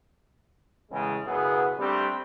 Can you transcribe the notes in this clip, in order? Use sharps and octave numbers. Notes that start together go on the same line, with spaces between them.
E2 A2 C#3 G#3
B1 F#2 C#3 B3 E4 G#4
G3 A3 C4 D4 G4